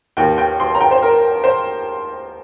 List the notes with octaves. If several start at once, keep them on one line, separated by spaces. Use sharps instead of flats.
D#2 D#3 G5
G5
C6
A#5
G5
C5
A#4
C5